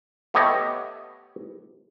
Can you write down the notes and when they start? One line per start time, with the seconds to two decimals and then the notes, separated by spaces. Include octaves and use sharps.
0.34 A3 B3 G4 C#5 D#5